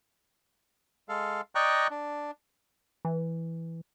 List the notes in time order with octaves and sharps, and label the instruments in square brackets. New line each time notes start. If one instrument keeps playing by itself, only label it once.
[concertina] G#3 A4 F5
D5 D#5 G5 A#5 C#6 F#6
D4
[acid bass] E3